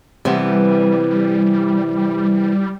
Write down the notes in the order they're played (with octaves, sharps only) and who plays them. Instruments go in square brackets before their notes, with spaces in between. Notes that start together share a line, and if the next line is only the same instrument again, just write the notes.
[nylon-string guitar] C3 E3 B3 [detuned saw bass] G3